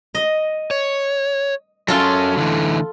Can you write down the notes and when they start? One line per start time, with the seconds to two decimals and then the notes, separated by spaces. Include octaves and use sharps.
0.15 D#5
0.71 C#5
1.88 F#3 C#4 F4 A4
2.38 D3 E3 A3